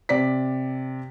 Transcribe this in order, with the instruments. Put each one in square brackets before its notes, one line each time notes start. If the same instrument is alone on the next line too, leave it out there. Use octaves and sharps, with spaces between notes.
[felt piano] C3 D5 B6